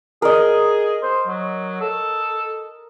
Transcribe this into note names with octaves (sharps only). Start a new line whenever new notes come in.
G#4 A#4 D#5
C5
F#3
A4